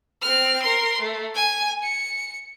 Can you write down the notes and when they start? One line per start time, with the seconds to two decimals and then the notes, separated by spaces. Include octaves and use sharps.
0.22 C4 F6
0.62 A#4 C6
1.00 A3
1.35 G#5
1.83 C#7